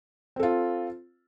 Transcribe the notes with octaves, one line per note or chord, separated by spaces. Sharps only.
C4 F4 A4